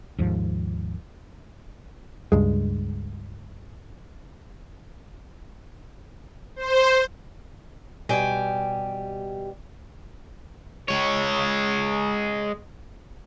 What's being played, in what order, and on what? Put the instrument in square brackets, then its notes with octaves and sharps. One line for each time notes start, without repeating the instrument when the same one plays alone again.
[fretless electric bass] D#2 G#2 F3
[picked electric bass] C#2 G2 G#3
[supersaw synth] C5
[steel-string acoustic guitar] B2 G3 G4 G5 G#5
[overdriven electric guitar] G#3 C#5